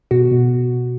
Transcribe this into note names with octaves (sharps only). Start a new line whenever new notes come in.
B2 F#4
B2